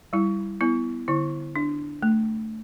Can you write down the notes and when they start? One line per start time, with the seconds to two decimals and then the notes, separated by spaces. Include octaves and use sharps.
0.13 G3 E4
0.61 B3 E4
1.08 D3 E4
1.56 D4
2.03 A3